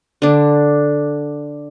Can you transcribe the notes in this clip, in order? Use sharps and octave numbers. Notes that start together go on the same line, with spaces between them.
D3 D4